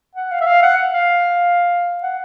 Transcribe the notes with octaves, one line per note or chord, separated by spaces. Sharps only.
F#5
F5
E5
F5
F#5
F5
F#5